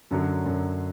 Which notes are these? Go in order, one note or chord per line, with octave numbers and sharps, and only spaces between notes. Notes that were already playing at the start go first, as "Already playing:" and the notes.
F#2 D3 F#3
F#2 D3 F#3